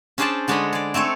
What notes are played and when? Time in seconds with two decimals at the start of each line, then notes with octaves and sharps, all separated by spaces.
0.18 C#4 D4 G#4 C5 D5 A5
0.48 D3 G#3 D4 C#5 D#5 B5
0.73 G#4 D5
0.94 A3 C4 A4 C#5